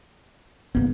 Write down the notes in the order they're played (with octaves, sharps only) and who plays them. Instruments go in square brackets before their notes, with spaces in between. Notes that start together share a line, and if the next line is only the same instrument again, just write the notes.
[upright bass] G#2 D#3 [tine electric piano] A#3 B3